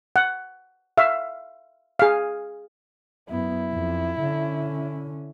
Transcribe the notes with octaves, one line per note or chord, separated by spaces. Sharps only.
F#5
E5 F5
G#4 F5
F#2 B3 E4
F2
D3 C#4